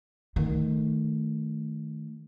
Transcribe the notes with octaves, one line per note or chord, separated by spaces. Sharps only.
D#3 A3